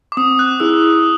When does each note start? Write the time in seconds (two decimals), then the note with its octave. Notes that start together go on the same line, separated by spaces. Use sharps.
0.12 D6
0.17 C4 D#6
0.39 F#6
0.60 E4 G#4 E6